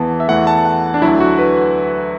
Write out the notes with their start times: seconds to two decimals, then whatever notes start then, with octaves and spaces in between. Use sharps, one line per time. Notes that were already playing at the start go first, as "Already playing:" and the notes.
Already playing: E2 E3 B3 A5
0.20 E5
0.28 E2 E3 A3 F#5
0.47 A5
0.65 F#5
0.94 D4
1.02 D2 D3 F#3 E4
1.20 F#4
1.38 B4